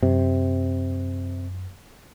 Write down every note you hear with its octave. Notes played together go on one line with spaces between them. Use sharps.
F#2 C3